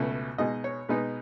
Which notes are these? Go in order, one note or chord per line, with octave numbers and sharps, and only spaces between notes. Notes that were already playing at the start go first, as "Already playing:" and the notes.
Already playing: C#2 B2 A3 C#4
B2 G#3 B3 D#4 D#5
C#5
B2 G#3 B3 D#4 B4